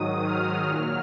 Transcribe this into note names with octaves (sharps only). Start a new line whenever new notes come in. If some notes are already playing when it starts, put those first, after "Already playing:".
Already playing: G#2 D#3 F#3 D#6
F6
A#2 F#3 F6